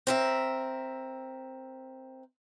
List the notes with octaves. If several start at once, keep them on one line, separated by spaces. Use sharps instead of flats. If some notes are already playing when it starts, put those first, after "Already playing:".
C4 A#4 E5